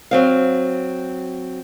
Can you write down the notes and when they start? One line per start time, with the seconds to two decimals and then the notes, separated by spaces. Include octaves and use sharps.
0.11 F#3 C4 F5